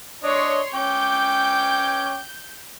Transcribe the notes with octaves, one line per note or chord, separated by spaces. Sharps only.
D4 C#5 D#5 C6
C#4 G5 D6 G6